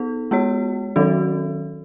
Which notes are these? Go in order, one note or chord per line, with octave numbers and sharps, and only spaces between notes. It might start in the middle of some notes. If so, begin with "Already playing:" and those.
Already playing: B3 D#4 A4
G#3 B3 F#4 C#5
D#3 F#3 C#4 F#4 A4